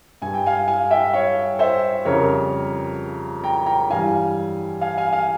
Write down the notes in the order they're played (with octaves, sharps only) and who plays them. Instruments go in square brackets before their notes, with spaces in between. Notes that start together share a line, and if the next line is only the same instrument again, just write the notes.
[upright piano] G2 G3 G#5
G5
F5 G#5
F5 G#5
E5 G5
C#5 F5
C5 E5
F2 C#3 G3 A#4 C#5
G5 A#5
G5 A#5
G2 E3 G3 F5 G#5
F5 G#5
F5 G#5
F5 G#5